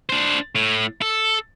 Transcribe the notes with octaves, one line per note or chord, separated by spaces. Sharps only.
D4 C5
A2
A4